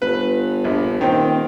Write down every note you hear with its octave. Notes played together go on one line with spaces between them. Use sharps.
G1 B4
A#1
D#1 D#3 C4